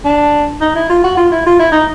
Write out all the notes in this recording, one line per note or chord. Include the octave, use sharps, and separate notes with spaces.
D4
D#4
E4
F4
F#4
F4
E4
F4
E4
D#4